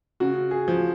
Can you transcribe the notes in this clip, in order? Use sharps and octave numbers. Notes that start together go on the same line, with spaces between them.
C#3 F#4
G#4
F3